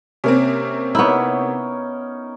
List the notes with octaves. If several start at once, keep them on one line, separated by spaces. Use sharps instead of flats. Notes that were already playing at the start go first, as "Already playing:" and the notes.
C3 A#3 C4 C#4
B3 D#4 E4 A#4 C#5